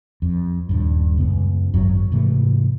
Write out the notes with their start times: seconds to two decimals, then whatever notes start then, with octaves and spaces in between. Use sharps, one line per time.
0.22 F2
0.69 D#1 G2
1.18 C#2 F#2 B3
1.74 G#1 F#2 F#3
2.12 G#2 C3 E3 A3